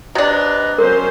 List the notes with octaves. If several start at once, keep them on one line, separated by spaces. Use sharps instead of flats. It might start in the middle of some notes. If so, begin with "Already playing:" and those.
C3 D4 B4 D#5 A#5
F#3 C#4 A#4 C5